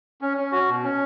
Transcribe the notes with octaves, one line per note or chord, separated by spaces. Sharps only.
C#4
C#4
F#4
B2
C#4